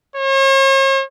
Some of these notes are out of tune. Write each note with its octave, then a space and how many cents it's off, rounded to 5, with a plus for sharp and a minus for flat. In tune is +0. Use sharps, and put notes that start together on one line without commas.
C#5 -45